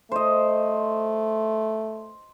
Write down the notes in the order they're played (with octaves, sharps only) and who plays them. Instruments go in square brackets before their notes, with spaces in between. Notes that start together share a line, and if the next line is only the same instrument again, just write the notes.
[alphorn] A3 [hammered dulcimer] C5 D#5